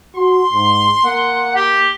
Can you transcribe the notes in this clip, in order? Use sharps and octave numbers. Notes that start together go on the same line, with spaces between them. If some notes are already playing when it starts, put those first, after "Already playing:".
F#4 C6
G#2
A#3 F#5
G4